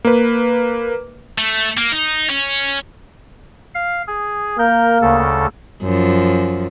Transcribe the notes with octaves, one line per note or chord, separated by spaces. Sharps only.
A#3 B4
A3
A#3
D#4
C#4
F5
G#4
A#3 A#4 G6
D2 C#3 A4
F#2 F3